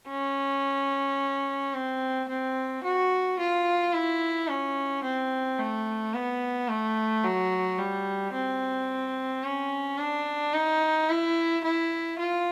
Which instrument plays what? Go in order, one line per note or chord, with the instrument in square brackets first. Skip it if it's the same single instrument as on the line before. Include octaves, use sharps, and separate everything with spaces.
[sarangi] C#4
C4
C4
F#4
F4
E4
C#4
C4
A3
B3
A3
F#3
G3
C4
C#4
D4
D#4
E4
E4
F4